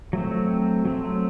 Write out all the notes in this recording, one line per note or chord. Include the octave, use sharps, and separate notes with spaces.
F#3 A3 C4
F#3 A3 C4